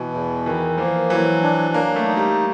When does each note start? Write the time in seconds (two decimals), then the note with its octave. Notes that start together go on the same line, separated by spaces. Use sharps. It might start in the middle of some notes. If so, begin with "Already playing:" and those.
Already playing: B2 E3
0.14 E2
0.46 D#3 E3
0.78 F3 A#3
1.10 E3 F#3
1.43 D4
1.74 F#3 A#3
1.96 A3
2.07 D#4
2.17 G3